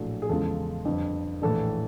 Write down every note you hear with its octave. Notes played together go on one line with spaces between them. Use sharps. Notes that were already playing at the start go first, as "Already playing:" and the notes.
Already playing: A#1 A2 F#3 A4
G#4
E2 C#3 F3 G#3 A4
G1 F2 D3
A#1 A2 E3 A4